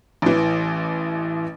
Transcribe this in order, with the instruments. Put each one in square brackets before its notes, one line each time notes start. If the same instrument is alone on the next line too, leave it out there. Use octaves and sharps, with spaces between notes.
[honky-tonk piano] A1 E3